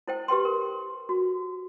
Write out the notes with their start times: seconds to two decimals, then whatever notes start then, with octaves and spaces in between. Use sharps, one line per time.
0.08 E4 C5 G5
0.28 G4 B4 G5 C6
0.45 A#4
1.09 F#4